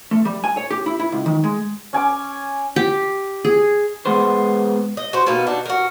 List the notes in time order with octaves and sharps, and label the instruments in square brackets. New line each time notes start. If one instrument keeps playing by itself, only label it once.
[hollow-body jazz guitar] A3
G3
G#5
C#5
G4
E4
E4
C#2
D#3
G#3
[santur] C#4 G#5 D6
[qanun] G4
G#4
[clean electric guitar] G#3 B3 C5
[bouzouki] D#5
F#4 C5
B2 A#3 B3 D#4
D4 D#4 F#4
F#4 A#4